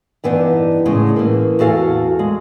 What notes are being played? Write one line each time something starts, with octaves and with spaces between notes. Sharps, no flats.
G2 E3 B3 D4 D#4
A2 C#3 G#3
E3 A#3
E2 F#4 A4 F5 G#5
G#3